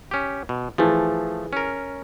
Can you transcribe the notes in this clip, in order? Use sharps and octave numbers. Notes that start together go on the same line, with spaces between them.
C#4 G4
B2
E3 F3 A3 G#4
C#4 A#4